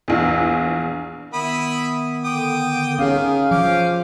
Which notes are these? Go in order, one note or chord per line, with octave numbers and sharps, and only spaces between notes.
A#1 E2
D#3 B3 E4 B5 D#6
D3 G5 D6 D#6
D#3 C#4 G#4 F5
F3 C#4 D6 F6 G6